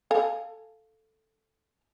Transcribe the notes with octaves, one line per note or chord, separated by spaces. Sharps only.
A4 F5 G#5